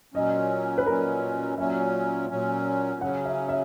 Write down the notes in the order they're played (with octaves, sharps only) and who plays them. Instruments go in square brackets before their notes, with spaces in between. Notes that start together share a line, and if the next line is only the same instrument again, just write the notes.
[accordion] A#2 F#3 C#4 [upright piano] D#5
[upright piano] B4
[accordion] A#2 F#3 C#4 [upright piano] A#4
[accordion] A#2 F#3 C#4 [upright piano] E5
[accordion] A#2 F#3 C#4
[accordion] C#3 F#3 C#4 [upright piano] F#5
[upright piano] E5
E5